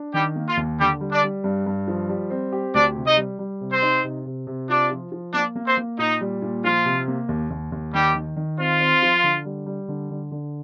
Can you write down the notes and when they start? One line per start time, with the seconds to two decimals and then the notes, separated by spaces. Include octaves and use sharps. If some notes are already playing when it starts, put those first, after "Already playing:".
Already playing: D4
0.14 D#3 G3 G4
0.36 A#3
0.47 F4
0.57 D#2
0.79 D3 G3 G4
1.01 G3
1.11 D4 D5
1.23 G3
1.44 G2
1.66 G2
1.88 F3
2.09 G3
2.30 C4
2.52 G4
2.74 D2 D4 D5
2.95 C3
3.06 D#4 D#5
3.17 G3
3.39 G3
3.61 C3
3.72 C4 C5
3.82 D#4
4.04 C3
4.26 C3
4.47 C3
4.69 D4 F4 D5
4.91 F3
5.12 F3
5.34 A#3 D4 D5
5.56 A#3
5.66 C4 C5
5.77 A#3
5.99 A#2 D#4
6.21 G3
6.42 A#2
6.64 F3 F4
6.85 C3
7.08 A#3
7.29 D#2
7.50 D#2
7.72 D#2
7.93 D#3 G3 G4
8.15 D#3
8.36 D#3
8.58 C4 F4
8.80 C4
9.02 F3
9.24 D3
9.45 G3
9.66 G3
9.88 D3
10.10 D3
10.31 D3